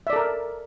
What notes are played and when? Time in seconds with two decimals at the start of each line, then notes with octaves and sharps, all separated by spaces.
0.07 E5
0.10 D5
0.13 A4
0.16 A#4